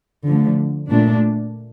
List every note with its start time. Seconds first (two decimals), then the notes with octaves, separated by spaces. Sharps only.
0.25 D3 F3 A3
0.90 A#2 A3 D4